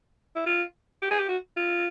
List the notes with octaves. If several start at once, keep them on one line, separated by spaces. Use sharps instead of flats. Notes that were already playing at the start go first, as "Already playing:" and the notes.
E4
F4
G4
G#4
G4
F#4
F4